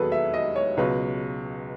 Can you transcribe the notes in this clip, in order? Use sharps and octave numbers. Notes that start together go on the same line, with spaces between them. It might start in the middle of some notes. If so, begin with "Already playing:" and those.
Already playing: E1 D#2 F#3 G#4 A4 B4
E5
D#5
C#5
C#2 B2 F#3 B4